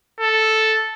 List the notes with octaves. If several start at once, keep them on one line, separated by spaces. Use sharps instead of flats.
A4